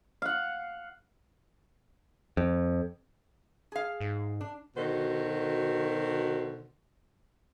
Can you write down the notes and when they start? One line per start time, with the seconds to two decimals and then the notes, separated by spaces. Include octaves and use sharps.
0.22 F5 F#5
2.37 F2
3.72 G#4 F5
4.01 G#2
4.41 D4
4.77 B2 D3 D#3 F#4 C5